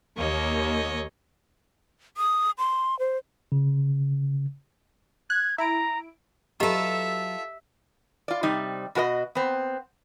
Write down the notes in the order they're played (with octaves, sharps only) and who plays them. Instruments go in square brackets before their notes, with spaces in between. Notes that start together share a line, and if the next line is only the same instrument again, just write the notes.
[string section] D#2 [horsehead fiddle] A#3 [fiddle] C#5 D#5
[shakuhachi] D#6
C6
C5
[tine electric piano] C#3
[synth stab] F#6 [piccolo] G#6
[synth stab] E4 D7 [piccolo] A#5
[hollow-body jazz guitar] F#3 B4 [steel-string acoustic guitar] F4 A4 [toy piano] G4 D#5 A#5 [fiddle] E5
[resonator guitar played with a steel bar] F4 D5
C3 G3 D#4
B2 F#4 A#4 D#5
B3 C4